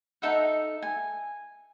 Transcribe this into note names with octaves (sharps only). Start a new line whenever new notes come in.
D#4 A4 E5 F#5
G#5